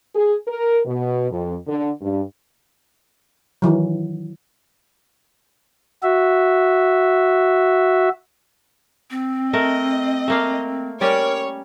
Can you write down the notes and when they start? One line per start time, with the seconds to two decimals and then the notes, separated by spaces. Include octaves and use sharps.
0.15 G#4
0.47 A#4
0.86 B2
1.31 F2
1.67 D3
2.01 G2
3.62 D#3 E3 F#3
6.03 F#4 E5
9.11 C4
9.53 A3 A#4 D#5
10.28 A3 A#3 F5
11.01 G3 C#4 A#4 C#5 D5